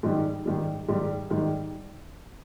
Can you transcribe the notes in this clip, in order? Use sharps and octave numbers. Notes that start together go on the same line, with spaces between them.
G#2 D#3 G3
G#2 D#3 G3
G#2 D#3 G3
G#2 D#3 G3